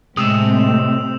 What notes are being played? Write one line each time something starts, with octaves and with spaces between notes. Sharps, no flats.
A2 C3 G#3 C4 D#6 E6 E7